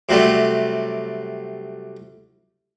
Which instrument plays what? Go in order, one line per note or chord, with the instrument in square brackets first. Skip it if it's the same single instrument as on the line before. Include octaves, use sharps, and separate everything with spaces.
[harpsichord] C3 F#3 G3 A3